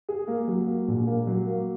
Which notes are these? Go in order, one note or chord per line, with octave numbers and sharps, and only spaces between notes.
G#4
A#3
F#3
A#3
A#1
A#3
F#3
A#3